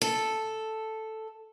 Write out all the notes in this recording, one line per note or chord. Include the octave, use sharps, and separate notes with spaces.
A4